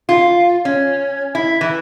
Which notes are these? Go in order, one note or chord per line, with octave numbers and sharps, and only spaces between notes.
F4
C#4
E4
E3